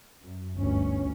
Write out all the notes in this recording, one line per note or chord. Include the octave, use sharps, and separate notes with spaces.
F#2
G1 D2 C#4